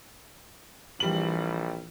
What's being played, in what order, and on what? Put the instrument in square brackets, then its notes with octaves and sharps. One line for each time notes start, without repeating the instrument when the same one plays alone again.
[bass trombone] A#1 [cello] E3 [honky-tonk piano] G3 F#7